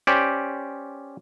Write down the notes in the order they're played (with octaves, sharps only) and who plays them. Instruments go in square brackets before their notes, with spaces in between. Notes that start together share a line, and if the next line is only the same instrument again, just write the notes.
[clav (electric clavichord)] C#4 G4 C5 D5